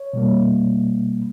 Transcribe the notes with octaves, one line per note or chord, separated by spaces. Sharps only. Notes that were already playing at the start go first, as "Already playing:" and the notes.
Already playing: C#5
B2 G3 A#3